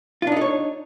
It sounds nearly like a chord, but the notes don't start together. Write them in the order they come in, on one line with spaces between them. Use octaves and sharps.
F4 D4 D#4 A4 C#5